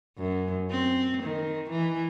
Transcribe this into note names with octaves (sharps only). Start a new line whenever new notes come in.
F#2
C4
D#3
E3